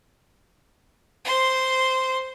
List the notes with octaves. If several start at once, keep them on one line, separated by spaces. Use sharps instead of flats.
C5 C6